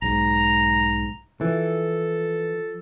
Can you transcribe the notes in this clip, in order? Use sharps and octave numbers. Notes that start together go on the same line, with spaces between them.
B1 G#2 A#5
E3 F3 A4